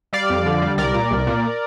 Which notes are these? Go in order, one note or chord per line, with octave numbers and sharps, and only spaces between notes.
G3 D5 F5
F2
D3
G3
C2 A#4 D5
A#2
C2
A#2